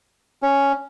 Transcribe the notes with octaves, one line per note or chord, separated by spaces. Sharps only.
C#4